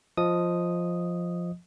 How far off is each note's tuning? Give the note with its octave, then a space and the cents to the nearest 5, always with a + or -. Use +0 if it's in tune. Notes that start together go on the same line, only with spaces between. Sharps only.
F3 +0 D#5 +0 D#6 +0